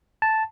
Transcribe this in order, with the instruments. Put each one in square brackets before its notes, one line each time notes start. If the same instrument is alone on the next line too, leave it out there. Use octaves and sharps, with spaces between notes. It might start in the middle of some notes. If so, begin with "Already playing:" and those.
[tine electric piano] A5